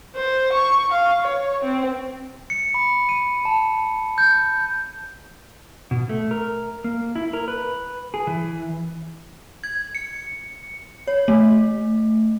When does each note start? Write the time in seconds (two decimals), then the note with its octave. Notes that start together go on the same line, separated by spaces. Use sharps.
0.15 C5
0.52 C#6
0.92 F5
1.22 C#5
1.63 C4
2.50 C#7
2.74 B5
3.09 D#7
3.45 A5
4.18 G6
5.91 B2
6.09 A3
6.31 A#4
6.84 A#3
7.16 E4
7.33 A#4
7.48 B4
8.14 G#4
8.27 E3
9.64 G#6
9.95 C#7
11.07 C#5
11.28 A3